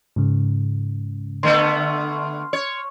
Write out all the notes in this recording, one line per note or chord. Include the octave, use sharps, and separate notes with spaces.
G#2 C#3
D3 A3 B3 C6 F6
C#5